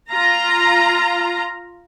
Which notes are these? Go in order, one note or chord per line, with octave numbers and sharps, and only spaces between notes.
F4 A#5